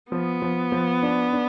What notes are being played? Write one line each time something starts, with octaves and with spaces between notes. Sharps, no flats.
F3 B3
F3
F3
D4
D4